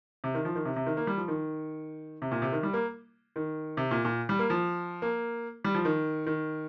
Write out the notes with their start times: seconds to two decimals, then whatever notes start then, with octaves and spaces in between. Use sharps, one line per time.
0.24 C3
0.34 D#3
0.45 F3
0.55 D#3
0.65 C3
0.76 C3
0.86 D#3
0.97 A#3
1.07 G3
1.17 F3
1.28 D#3
2.22 C3
2.31 A#2
2.42 C3
2.52 D#3
2.63 G3
2.73 A#3
3.36 D#3
3.77 C3
3.91 A#2
4.05 A#2
4.29 G3
4.39 A#3
4.50 F3
5.02 A#3
5.64 G3
5.74 F3
5.85 D#3
6.26 D#3